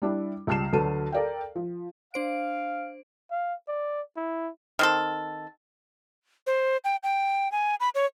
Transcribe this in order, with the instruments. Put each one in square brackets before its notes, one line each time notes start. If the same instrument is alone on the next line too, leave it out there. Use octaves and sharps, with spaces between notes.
[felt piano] G3 D4 E4
C#2 G3 A5 F6 C7 E7
D2 D3 F#3 B4 A5 D#7
A4 A#4 D5 F5 G5
F3
[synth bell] D4 C5 D7 [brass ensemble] F5
[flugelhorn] F5
D5
E4
[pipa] D#3 C4 A4
[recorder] C5
G5
G5
G#5
B5
C#5